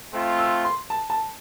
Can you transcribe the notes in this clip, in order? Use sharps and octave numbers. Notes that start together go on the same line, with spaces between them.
A3 C4 F4
E6
C6
A5
A5